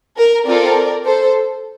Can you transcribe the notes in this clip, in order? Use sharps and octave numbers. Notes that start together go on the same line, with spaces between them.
A#4
C4 F4 A4 A#4 D5
A4 C5